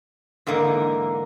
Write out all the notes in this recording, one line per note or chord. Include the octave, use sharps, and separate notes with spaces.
G#2 D3 E3 A#3 D#4